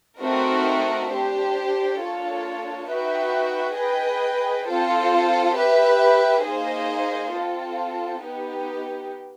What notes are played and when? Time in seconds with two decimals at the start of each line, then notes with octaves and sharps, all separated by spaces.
0.21 A3 C4 D#4 F#4 A#4
1.10 D4 G4 C5
1.99 A#3 D4 F4 A4 C#5
2.88 D#4 F#4 B4 E5 G5
3.77 G#4 B4 D#5 G5
4.66 C4 F4 A4 C5
5.54 G4 B4 E5
6.43 A#3 D#4 G#4 C5 D#5
7.32 C4 F4 A4
8.21 B3 D#4 G4